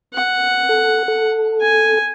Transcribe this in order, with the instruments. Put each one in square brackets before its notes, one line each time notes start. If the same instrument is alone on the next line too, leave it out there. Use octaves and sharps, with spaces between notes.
[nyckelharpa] F#5
[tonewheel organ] A4
A4
[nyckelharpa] G#5